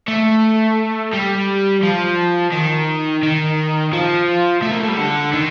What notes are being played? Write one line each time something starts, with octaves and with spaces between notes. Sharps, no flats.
A3
G3
F3
D#3
D#3
F3
A3
A#3
A3
G3
D3
D#3